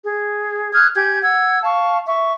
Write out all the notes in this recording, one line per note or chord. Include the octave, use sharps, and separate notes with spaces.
G#4
D#6 F6 F#6 G#6
G4 G#5 G6 G#6
F#5 E6 G#6
F5 A5 C#6
E5 C#6